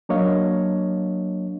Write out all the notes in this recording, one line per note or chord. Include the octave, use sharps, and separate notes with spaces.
F#3 A#3 D4 C#5 D#5 F5